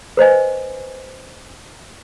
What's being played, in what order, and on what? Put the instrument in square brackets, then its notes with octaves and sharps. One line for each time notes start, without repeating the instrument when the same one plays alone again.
[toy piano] B4 C5 D#5 G#5